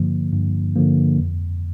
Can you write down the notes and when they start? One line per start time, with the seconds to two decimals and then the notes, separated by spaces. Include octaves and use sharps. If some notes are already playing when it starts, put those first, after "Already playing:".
Already playing: G2 D3 F3 A#3
0.33 G2
0.76 D3 F3 A#3
1.19 F2